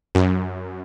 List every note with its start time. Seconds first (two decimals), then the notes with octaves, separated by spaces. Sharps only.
0.15 F#2